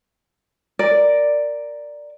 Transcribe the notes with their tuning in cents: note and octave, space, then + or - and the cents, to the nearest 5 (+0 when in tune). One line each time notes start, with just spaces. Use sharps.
A#4 +0 D5 +0